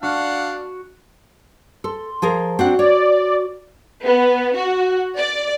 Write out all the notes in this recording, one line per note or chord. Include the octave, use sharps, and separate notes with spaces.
D4 F#4 F5 F#5
A4 C6
F3 G#4 A#4
C4 D4 F#4 F#5
C#5 D5
B3
F#4
D5